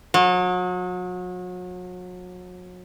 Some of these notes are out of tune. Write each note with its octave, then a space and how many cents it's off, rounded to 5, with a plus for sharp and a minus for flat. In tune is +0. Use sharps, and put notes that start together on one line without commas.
F#3 -35